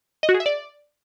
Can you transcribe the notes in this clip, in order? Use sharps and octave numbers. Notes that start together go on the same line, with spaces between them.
D#5
F#4
G#4
E5
D5